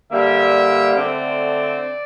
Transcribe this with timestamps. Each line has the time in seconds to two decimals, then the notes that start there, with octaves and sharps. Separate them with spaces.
0.10 D3 G3 A#3 E5
0.94 D3 A3 C4 D5